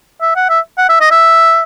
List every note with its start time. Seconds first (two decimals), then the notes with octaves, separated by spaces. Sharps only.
0.21 E5
0.36 F#5
0.50 E5
0.78 F#5
0.89 E5
1.01 D#5
1.11 E5